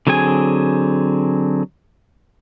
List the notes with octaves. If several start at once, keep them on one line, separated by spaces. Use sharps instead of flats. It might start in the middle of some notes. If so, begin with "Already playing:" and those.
D3 F#3 C4 G#4 G#5